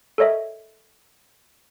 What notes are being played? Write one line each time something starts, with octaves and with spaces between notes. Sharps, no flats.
A4 A#4 C#5 D#5 E5